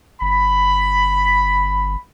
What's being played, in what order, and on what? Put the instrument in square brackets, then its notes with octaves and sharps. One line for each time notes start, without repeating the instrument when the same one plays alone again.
[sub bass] G1 [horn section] B5